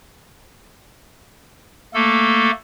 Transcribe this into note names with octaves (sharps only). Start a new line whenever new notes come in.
A3 A#3 A4